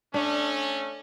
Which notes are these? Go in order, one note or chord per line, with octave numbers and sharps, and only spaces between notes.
A3 C#4 D4